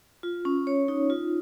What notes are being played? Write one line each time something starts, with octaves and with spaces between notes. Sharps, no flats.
F4
C#4
C#5
D#4
F4